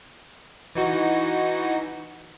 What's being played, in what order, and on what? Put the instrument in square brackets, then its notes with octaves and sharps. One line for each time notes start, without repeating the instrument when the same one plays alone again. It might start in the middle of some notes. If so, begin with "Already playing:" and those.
[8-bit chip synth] E3 D#4 F#4